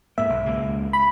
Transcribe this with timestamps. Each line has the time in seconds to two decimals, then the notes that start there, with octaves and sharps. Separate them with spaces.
0.18 G#2 A#3 E5
0.30 B1
0.46 C#2 G#3 A#3
0.93 B5